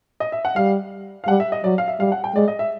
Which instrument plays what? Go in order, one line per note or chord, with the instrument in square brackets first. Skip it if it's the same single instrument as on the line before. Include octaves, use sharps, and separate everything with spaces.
[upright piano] D#5
E5
F#5
[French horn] G3 [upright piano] F5
[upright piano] F5
[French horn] G3 [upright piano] F#5
[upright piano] E5
D#5
[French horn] F#3 [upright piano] D5
[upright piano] F5
E5
[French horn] G3 [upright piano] F5
[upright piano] F#5
G5
[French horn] G#3 [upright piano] D5
[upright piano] D#5
E5